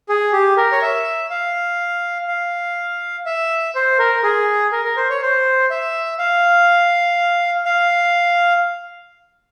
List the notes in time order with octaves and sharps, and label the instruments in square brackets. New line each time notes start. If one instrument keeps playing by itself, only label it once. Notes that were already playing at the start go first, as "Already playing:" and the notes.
[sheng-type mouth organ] G#4
G4
A#4
C#5
E5
F5
F5
E5
C5
A#4
G#4
A#4
A#4
C5
C#5
C5
E5
F5
F5